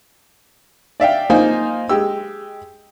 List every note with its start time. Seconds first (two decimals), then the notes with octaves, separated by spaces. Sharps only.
1.00 D5 E5 F5 G5
1.30 A#3 D#4 F4 C5 F5 G#5
1.89 G#3 G4 E6